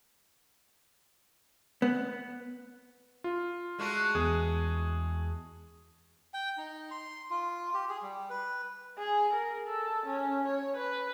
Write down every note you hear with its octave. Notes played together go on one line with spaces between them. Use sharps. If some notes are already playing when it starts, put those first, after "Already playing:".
B3
F4
G#3 A3 F#4
E2 G#4
G5
D#4
C6
F4
G4
G#4
G3
B4
G#4
A#4
A4
C#4
C#5
B4